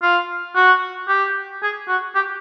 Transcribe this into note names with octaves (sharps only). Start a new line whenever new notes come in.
F4
F#4
G4
G#4
F#4
G4